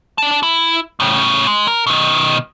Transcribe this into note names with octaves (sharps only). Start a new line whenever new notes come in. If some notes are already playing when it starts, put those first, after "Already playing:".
D4 A5
E4
A2 C#3
G#3
A#4
B2 D#3